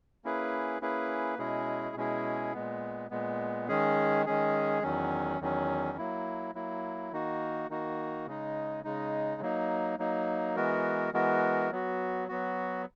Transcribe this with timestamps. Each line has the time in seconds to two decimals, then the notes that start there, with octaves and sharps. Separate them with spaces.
0.24 A#3 C#4 E4 G#4 B4
0.81 A#3 C#4 E4 G#4 B4
1.39 B2 G#3 C#4 E4 G#4
1.96 B2 G#3 C#4 E4 G#4
2.53 A#2 G#3 B3
3.11 A#2 G#3 B3
3.68 D#3 G#3 C#4 G#4
4.26 D#3 G#3 C#4 G#4
4.82 E2 D#3 F#3 C#4
5.40 E2 D#3 F#3 C#4
5.98 F#3 A#3 E4
6.55 F#3 A#3 E4
7.12 D#3 A#3 D#4 F#4
7.69 D#3 A#3 D#4 F#4
8.27 C#3 G#3 D#4
8.84 C#3 G#3 D#4
9.42 F#3 A#3 D#4
9.99 F#3 A#3 D#4
10.56 E3 G#3 B3 F#4 A#4
11.13 E3 G#3 B3 F#4 A#4
11.71 F#3 B3 F#4
12.28 F#3 B3 F#4